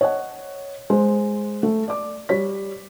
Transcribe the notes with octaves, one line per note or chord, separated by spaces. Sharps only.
C#5 D#5 F#5
G#3 C5
A3
D5 D6
G3 C#5 B6